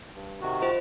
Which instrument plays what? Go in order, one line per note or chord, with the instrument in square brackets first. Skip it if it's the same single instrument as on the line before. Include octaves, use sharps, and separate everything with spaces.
[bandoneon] G2
C3 D#3 F#4
[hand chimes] F4 C5 D#5